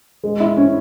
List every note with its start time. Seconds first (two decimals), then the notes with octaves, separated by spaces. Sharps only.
0.24 G#3
0.40 E4
0.57 C#4